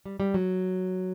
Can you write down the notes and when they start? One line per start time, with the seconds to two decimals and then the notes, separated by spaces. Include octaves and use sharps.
0.06 G3
0.20 G3
0.34 F#3